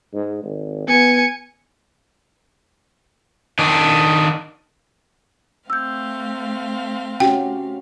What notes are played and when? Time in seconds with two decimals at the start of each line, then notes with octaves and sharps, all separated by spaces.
0.14 G#2
0.44 G#1
0.88 B3 G#5 C#7
3.59 D#3 D4
5.70 A3 C4 F5 E6 G6
7.20 C#4 F#4 G4 G5